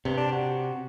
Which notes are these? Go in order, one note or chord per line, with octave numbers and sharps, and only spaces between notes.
G2 C3
D4
F#4